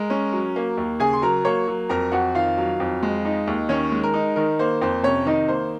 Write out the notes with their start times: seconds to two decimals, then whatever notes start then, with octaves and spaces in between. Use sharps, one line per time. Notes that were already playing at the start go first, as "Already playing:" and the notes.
Already playing: G#3 A#4
0.10 C#4
0.33 F#3
0.56 A#3
0.77 D#2
1.00 C#3 G#4 G#5
1.13 C6
1.22 F#3 A#4 A#5
1.45 A#3 C#5 C#6
1.68 F#3
1.89 F2 A#4 A#5
2.12 F2 F#4 F#5
2.35 D#3 F4 F5
2.58 F#3
2.80 F2
3.03 G#3
3.25 D#4
3.47 D#2
3.69 D#3 C#4 C#5
3.92 G#3
4.03 A#4
4.14 D#4
4.36 D#3 A#4
4.59 A#3 C5
4.81 F2 C5
5.03 C3 C#4 C#5
5.26 D#3 D#4 D#5
5.48 A#3 C5